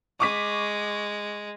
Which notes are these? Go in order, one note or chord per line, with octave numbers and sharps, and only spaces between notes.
G#3 C#6 D6 B6